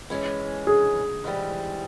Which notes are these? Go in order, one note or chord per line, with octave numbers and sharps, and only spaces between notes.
E3 G#3 C#4
G#4
G#2 E3 G3